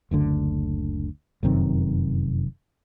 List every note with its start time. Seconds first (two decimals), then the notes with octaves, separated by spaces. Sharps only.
0.11 F#1 D2 D3
1.43 F1 F#2 C3 D#3